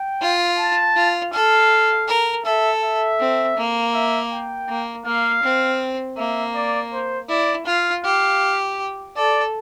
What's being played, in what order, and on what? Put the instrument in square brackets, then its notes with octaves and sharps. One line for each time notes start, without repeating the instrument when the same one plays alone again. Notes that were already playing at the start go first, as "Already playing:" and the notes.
Already playing: [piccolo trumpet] G5
[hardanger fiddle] F4
[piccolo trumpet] A5
[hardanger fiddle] F4
[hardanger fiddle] A4 [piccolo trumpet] F5
[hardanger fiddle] A#4
[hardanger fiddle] A4 [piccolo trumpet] E5
[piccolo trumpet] E5
[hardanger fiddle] C4
A#3
[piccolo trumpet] E5
G5
[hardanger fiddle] A#3
[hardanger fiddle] A#3 [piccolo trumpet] F5
[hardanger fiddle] C4
[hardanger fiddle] A#3 [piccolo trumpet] E5
[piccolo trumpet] D5
C5
[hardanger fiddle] E4 [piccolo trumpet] D5
[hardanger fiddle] F4 [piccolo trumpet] F5
[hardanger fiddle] G4 [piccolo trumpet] F5
[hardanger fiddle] A4 [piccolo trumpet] D5